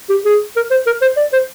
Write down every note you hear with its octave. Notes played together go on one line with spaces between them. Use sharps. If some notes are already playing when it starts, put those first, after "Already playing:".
G4
G#4
A#4
C5
A#4
C5
D5
C5